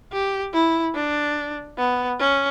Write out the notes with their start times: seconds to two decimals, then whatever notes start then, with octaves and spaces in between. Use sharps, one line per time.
0.13 G4
0.54 E4
0.95 D4
1.78 B3
2.20 C#4